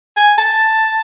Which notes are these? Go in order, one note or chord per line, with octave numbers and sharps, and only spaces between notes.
G#5
A5